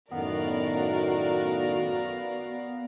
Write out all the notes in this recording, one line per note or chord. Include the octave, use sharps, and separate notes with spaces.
F#2 A2 D#3 B3 F#4 A#4 D5 F5